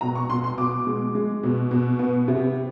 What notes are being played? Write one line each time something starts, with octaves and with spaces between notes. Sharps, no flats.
B2 A#5
C#6
B2 C6
C6
B2 D6
G#3
G#3
B2
B2
B3
C3